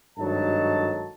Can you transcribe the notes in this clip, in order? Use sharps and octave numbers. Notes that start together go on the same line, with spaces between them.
G#1 G2 F#3 D#4 A4 A5